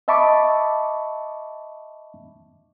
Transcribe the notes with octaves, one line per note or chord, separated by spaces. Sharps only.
D#5 E5 A5 B5 C#6 D6